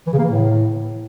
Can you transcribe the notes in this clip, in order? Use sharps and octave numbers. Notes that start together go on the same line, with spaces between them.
E3
C#3
A#3
E3
A2